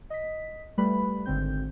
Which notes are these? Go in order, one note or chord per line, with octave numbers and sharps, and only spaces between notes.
D#5 B6
G3 A3 B4 B5
G#1 D3 C4 G6